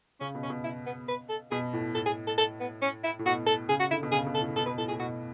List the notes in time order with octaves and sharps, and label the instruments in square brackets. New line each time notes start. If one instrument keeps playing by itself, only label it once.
[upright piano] C#3 [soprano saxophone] C#4
[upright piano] B2
[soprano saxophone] C#4
[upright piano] B2
[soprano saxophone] E4
B3
B4
A4
[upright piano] B2 [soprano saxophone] G#4
[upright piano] A2
[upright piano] A2 [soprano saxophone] A4
[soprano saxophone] G#4
A4
A4
B3
C#4
E4
[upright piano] A2
[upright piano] B2 [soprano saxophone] F#4
[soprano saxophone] A4
[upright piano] C#3 [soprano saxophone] G#4
[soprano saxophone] F#4
[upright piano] D3 [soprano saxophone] E4
[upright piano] B2
[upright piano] C#3 [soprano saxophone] G#4
[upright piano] B2
[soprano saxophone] A4
[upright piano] A2
[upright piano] B2 [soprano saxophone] A4
[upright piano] B2 [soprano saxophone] B4
[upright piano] A2 [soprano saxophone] A4
[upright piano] A2 [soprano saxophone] G#4
[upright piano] B2 [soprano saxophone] F#4